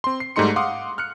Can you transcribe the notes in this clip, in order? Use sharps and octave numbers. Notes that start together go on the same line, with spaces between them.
C4 C6
C7
G#2 G3 A3 D#4 C6 C#7
F5 F#5 C6 D6 D#6
F6 F#6 C#7